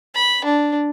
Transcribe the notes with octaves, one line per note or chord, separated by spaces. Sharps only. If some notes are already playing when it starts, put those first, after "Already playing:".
B5
D4